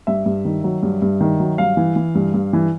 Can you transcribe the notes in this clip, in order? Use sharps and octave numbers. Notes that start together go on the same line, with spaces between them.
G2 E5
G2
D#3
F#3
G2
G2
D#3
F#3
G2 F5
E3
E3
G2
G2
E3